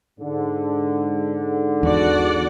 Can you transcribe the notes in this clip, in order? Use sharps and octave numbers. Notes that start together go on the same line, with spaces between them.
G#2 D3
E2 F#4 D5 F#5